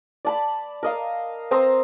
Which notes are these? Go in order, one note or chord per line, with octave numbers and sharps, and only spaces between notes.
D5 A5 B5
A#4 D#5 F5
C4 C5 A#5 D#6